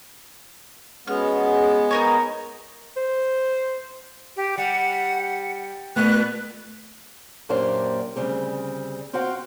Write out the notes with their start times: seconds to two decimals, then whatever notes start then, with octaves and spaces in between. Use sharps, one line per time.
1.07 G#3 B3 C#4 F#4 G#4 F6
1.91 D#4 A#4 C#5
2.97 C5
4.37 G4
4.57 G3 F#5
5.96 A#2 A3 B3 F#6
7.49 F#2 A#2 A#3 D4 G4 C5
8.16 D2 C#3 G3 C4 G#4
9.13 C4 F4 F#4 C5 F5 G5